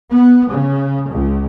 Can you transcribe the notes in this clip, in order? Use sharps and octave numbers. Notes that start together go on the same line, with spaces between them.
B3
C#3
C#2